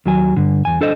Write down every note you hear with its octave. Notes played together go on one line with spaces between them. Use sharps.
D#2 F#3 G#5
G2 D3
E2 G#5
D4 A4 C5 D#5